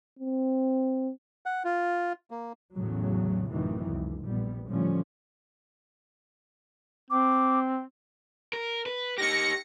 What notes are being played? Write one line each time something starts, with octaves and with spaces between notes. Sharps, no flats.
C4
F#5
F4
A#3
A1 E2 A2 C#3 F#3
A1 F#2 C3 D#3 E3
C#2
A#1 G3 B3
A2 D3 F3 G3 C#4
C4 D6
A#4
B4
D#4 G4 A#6 C#7